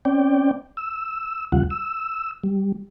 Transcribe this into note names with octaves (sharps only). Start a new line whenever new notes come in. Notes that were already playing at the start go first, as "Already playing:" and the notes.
C4 C#4 D5 G5
E6
D#2 C#3 G3 F4 F#5
E6
G3